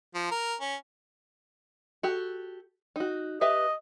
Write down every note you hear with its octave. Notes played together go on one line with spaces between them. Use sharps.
F3
A#4
C#4
F#4 G4 A4
D#4 F#4
G4 B4 D#5 E5